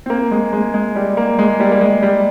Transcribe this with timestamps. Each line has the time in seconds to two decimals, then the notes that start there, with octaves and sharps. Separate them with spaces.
0.06 C4
0.10 A#3
0.31 G#3
0.53 G#3
0.74 G#3
0.96 G3
1.17 A#3
1.39 G#3
1.60 G3
1.71 A#3
1.81 G#3
2.02 G3